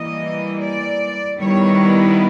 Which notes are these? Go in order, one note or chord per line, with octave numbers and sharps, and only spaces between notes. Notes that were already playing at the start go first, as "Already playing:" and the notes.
Already playing: E3 G3 A#3 D#5
D5
D#3 G3 B3 E4 C#5